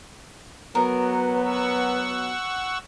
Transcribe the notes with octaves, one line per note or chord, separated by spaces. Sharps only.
F#3 B3 A#4 B4
F#5 C#6 E6